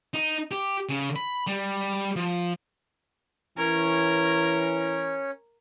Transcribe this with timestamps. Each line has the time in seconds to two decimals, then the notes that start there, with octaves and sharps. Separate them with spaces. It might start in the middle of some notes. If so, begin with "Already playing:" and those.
0.14 D#4
0.51 G4
0.89 C#3
1.16 B5
1.47 G3
2.16 F3
3.58 E3 C#4 A#4 C#5